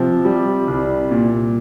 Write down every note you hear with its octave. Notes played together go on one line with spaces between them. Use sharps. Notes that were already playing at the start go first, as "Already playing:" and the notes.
Already playing: C3 F3
G3
C2
A#2